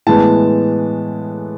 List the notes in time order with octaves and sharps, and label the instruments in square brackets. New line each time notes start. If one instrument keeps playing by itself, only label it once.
[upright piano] A2 E3 G#3 B3 A5